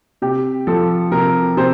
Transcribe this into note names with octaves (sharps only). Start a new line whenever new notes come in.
C3 G4
F3 A4
C3 A#4
C3 C5